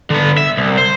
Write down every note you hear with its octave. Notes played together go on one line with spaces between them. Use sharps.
D3 B3
E5
C2
C5